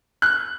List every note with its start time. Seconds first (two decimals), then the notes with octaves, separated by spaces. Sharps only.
0.22 F#6